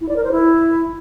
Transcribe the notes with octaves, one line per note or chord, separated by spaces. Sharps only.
E4
D5
A#4
C5
E4